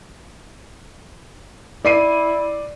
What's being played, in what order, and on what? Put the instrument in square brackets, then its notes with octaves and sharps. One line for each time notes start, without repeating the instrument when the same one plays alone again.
[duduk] E4 [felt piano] D5 C7 D#7